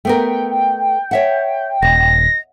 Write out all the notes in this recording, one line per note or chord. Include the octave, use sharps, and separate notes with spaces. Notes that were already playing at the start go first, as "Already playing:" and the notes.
A3 B3 A#4 G5
C#5 E5 F#5
D#1 D#5 A#6